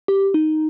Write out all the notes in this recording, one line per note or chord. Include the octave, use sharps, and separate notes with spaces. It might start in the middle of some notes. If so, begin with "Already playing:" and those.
G4
D#4